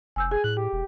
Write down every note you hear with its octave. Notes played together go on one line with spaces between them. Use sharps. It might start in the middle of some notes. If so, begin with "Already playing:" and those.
F1 G#5 E6 G6
G#4 G#5
A2 F#6
G4
E1